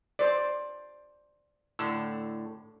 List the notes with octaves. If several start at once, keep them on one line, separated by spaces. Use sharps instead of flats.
C5 D5
A2 D3 E6